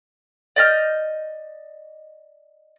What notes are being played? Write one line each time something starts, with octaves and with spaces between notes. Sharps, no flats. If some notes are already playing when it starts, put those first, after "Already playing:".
D5 D#5 F6 G6